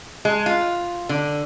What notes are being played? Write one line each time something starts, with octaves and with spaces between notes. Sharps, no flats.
G#3
F4
D3